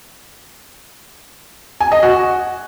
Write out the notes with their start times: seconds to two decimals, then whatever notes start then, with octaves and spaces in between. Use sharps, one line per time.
1.80 G#5
1.92 D#5
2.03 F#4